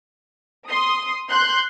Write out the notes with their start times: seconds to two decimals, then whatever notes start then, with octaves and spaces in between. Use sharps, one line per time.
0.69 C6 D#6
1.30 C6 F#6 G6